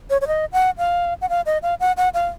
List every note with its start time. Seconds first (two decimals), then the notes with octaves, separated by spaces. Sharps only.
0.10 C#5
0.21 C#5
0.27 D#5
0.53 F#5
0.78 F5
1.21 F#5
1.29 F5
1.46 D#5
1.63 F5
1.80 F#5
1.97 F#5
2.14 F5